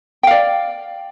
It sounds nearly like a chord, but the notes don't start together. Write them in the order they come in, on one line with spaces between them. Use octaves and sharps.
G5 F5 D5